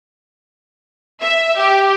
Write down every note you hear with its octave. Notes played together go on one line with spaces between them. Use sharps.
E5
G4